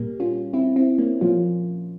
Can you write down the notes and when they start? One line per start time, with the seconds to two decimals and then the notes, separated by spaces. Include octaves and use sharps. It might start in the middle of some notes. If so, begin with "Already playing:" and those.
Already playing: A#2 G3 A#3
0.20 C#4 F4
0.53 C4 E4
0.76 C4 E4
0.98 A#3 C#4
1.21 A#2 F3 A#3 C#4 F4